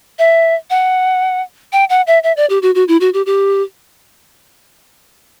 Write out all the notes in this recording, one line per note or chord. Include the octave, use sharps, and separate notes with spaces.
E5
F#5
G5
F#5
E5
E5
D5
G4
F#4
F#4
E4
F#4
G4
G4